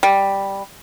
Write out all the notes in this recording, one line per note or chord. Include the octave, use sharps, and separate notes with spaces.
G3